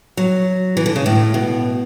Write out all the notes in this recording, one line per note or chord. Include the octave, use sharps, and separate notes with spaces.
F#3
E3
D3
C#3
A2
B2